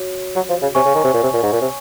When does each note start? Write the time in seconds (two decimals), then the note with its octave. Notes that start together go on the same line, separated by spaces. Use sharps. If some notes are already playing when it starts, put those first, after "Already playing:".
Already playing: F#4 C#5
0.36 F#3
0.49 F3
0.62 C#3
0.75 C3 C#5 G#5 C#6
0.85 C#3
0.95 D#3
1.04 C3
1.14 A#2
1.23 C3
1.33 A#2
1.43 G#2
1.53 A#2
1.62 C3